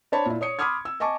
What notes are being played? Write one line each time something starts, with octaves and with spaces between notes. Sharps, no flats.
D4 C5 C#5 A5 B5
A#2 E4
C#5 D#6 C#7
B5 C6 D6 D#6 F6 G#6
E6
D#5 G#5 A5 C#6 D6